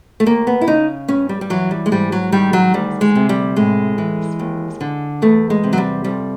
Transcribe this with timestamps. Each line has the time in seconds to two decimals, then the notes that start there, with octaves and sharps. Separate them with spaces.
0.20 A3
0.26 D#2 A#3
0.47 B3
0.61 E4
0.67 C#3 D#4
1.08 G2 C#4
1.29 G3
1.41 G3
1.50 E3 F#3
1.71 G3
1.86 G#3
1.92 G#2 G3
2.12 F#3
2.32 D#3 G3
2.53 F#3
2.74 D2 G3
3.01 G#3
3.15 C3
3.29 G3
3.56 A2 G#3
3.98 E3
4.39 D#2
4.81 D3
5.22 E2 A3
5.50 G#3
5.64 C3
5.73 F#3
5.78 G3
6.04 F2 G3